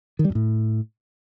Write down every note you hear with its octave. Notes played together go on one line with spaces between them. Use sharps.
D#3
G3
F#2
A2